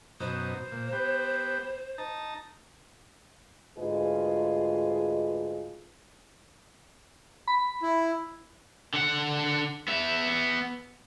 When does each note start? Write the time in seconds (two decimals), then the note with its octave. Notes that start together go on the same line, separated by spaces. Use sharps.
0.20 F#2 B2 D#4 C5
0.72 A#2
0.92 B3 G4
1.98 D#4 A5 A#5
3.78 D2 G#2 F4 G#4 B4 D#5
7.48 B5
7.82 E4
8.94 D3 F#5
9.88 B3 E5